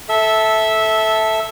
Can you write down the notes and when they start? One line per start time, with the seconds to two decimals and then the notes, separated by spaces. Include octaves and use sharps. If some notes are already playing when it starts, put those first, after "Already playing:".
0.09 A4 E5